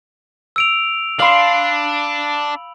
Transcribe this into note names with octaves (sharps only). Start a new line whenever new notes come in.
E6 D7 F7
D4 F5 B5 C6 F#7